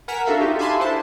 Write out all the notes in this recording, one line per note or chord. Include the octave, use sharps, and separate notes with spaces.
A#4 F#5 G#5 A#5 B6 E7
D4 F#4 A4 E5 F5
D#4 F4 G4
E5 F5 G#5 A5 B5 C6
D4 E4 A4 C5 A5